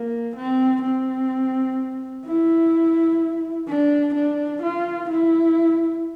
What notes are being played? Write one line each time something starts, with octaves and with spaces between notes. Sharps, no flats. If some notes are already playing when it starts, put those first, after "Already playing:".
Already playing: A#3
C4
C4
E4
D4
D4
F4
E4